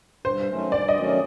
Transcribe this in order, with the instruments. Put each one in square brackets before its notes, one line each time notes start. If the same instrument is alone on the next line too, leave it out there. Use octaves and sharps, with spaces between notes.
[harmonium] G2 [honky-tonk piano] C5
[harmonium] D#3 F#3 A3 C#4
[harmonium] G2 [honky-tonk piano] D5
[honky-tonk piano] D#5
[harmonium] D#3 F#3 A3 C#4